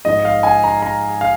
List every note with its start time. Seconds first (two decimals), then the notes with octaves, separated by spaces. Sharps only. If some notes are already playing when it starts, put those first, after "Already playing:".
0.05 G#2 F3 D#5
0.25 F5
0.43 G#5
0.64 A#5
0.82 A#5
1.21 F5